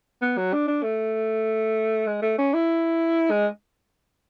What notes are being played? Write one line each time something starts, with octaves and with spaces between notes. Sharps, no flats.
B3
F#3
D4
D4
A3
G#3
A3
C#4
E4
G#3